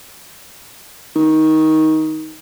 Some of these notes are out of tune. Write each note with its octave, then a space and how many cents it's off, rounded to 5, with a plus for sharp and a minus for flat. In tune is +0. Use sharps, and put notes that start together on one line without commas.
D#3 +15